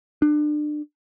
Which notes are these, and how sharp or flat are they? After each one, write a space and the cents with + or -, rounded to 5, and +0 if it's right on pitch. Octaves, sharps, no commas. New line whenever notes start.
D4 +30